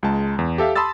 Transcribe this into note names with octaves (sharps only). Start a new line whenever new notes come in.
C#2 G#3 A5
E2
G4 A4 E5 F5
A5 B5 C6 D#6 E6 A6